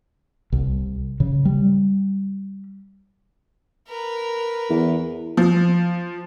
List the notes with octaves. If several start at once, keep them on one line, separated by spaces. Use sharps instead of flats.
C2
C#3
G3
A#4 B4
E2
F3